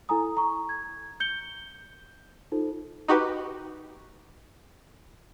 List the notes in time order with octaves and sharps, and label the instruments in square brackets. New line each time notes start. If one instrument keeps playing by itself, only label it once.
[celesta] E4 A4 G#5 A#5 D#6
A#5 C#6
G#6
G6 C#7 G7
D#4 F4 A4 C5
[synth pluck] D#4 F#4 G4 B4